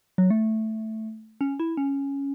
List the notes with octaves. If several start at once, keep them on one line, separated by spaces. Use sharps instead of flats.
F#3
A3
C#4
E4
C#4